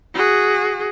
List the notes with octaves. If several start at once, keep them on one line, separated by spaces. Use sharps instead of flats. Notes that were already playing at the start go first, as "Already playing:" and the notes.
F#4 G#4